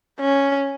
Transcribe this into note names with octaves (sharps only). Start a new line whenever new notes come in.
C#4